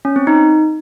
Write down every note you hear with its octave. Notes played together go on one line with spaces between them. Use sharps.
C#4
C4
D#4